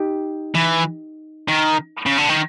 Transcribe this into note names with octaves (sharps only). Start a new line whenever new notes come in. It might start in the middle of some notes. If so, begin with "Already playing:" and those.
Already playing: D#4 G4
E3
D#3
C#3
D3
D#3